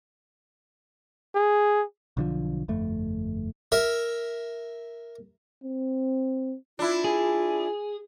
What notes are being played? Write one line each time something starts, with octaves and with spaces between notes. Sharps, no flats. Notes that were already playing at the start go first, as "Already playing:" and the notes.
G#4
B1 D3 F3
G1 F2 A3
A#4 E5
C4
D4 E4 F4
G#4